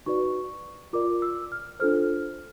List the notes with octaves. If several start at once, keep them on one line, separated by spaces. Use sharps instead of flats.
D#4 F#4 B4 D5 C#6
F4 A#4 D5 D6
E6
F6
D4 F4 A4 C5 F6